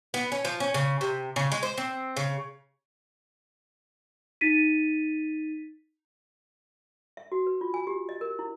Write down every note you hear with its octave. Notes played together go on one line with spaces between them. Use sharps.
B3
C#4
F3
C#4
C#3
C3
C#3
G#3
C5
C4
C#3
D#4 A6 B6 D#7
E5
F#4
B4
F4
G#5
G4
D#5
A#4
E4